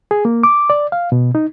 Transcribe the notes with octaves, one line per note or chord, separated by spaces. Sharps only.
G#4
A#3
D6
D5
F5
B2
D#4